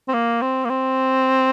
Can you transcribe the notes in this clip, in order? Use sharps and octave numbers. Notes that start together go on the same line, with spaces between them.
C4
A#3
C4
A#3
C4